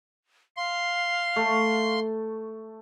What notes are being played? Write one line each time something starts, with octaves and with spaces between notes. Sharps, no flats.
F5 C6
A3